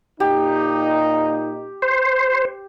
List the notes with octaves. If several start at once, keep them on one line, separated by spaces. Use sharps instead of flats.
A#2 D#4 G4
C5